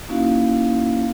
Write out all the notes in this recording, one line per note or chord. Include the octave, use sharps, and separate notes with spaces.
A#3 C#4 D#4 E4 F#4 F5